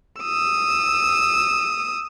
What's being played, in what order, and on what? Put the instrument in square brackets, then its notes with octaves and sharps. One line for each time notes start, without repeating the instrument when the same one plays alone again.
[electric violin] D#6 E6